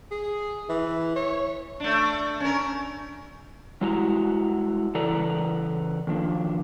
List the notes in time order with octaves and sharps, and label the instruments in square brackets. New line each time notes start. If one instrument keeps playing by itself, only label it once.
[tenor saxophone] G#4
E3
C#5
[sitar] A3 D4
C#4 A#4
[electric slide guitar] G3 G#3 E4 F#4 G5 A#5
C#3 E3 A4 B4 D5 A#5
D#3 F3 A#3 D4